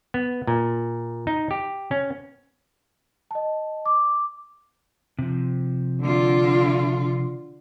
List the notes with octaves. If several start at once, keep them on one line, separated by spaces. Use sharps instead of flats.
B3
A#2
D#4
G4
C#4
D#5 A5
D6
C3 F3
D3 F4